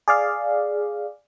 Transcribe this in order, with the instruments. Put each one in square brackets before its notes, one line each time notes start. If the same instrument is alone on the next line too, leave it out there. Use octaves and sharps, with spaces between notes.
[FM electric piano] G#4 D5 F5